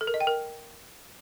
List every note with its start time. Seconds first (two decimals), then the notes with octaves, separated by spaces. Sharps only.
0.01 A4
0.07 A#4
0.14 D#5
0.20 G5
0.27 A#4